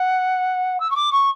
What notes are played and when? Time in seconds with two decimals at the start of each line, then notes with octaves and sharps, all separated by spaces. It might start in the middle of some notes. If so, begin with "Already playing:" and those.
Already playing: F#5
0.80 E6
0.91 C#6
0.96 D6
1.12 C#6